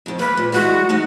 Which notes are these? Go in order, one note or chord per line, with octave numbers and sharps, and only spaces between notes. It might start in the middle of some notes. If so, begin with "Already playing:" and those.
F2 D#3
A#3 B4
A#2
E3 G3 G#3 F#4
A3 D#4 F#5